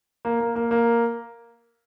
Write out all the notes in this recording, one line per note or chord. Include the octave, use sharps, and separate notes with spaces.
A#3
A#3
A#3
A#3